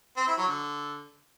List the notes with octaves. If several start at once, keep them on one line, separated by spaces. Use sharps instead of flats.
C4
E4
F#3
D3